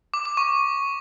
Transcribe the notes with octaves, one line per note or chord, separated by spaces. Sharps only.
D6
D6
C#6